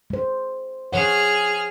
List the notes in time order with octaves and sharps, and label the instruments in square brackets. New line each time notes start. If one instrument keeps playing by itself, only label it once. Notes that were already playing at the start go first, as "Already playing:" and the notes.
[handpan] G#3 C5
[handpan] F3 C#5 F#5 [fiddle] G#4 F6